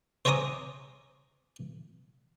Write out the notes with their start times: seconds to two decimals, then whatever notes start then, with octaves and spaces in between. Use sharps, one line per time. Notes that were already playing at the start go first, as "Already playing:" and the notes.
0.25 C5 C#5 G#5 A#5 D6 D#6